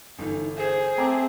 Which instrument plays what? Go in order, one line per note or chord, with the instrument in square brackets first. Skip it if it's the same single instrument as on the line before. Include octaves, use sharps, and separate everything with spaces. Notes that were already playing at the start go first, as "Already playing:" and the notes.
[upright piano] G1 E3 [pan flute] D#4
[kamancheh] G#4 [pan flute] C5
[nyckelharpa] A3 C4 [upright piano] G5 A#5 D6